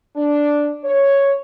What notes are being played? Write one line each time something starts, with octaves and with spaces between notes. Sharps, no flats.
D4
C#5